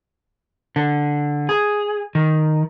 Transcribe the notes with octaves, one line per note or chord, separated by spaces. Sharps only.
D3
G#4
D#3